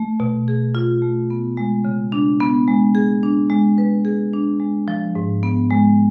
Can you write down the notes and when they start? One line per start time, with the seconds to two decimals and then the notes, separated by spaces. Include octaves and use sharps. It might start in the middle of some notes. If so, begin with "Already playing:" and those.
Already playing: A3
0.20 B2
0.48 G#4
0.75 F4
1.02 A3
1.30 B3
1.57 G#3
1.85 C#3
2.12 D4
2.40 B3
2.68 G#3
2.95 G#4
3.23 D4
3.50 G#3
3.78 B4
4.05 G#4
4.33 D4
4.60 G#3
4.88 F3
5.15 G#2
5.43 B3
5.70 G#3